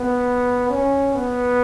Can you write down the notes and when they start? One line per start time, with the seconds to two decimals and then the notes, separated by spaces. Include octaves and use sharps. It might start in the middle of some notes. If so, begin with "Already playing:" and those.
Already playing: B3
0.70 C#4
1.15 B3